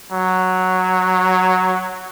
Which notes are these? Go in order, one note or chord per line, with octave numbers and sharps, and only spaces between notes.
F#3